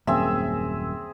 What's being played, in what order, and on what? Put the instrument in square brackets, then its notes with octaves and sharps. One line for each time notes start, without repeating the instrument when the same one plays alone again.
[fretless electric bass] D#1 F#2 A#3 [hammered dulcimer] C4 G#4 E5